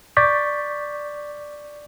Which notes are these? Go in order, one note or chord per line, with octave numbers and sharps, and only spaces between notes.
D5 C#6 D6 G6 A6 B6